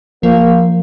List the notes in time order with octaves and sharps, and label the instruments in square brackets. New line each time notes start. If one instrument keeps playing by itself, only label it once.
[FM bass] F3 [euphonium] A#3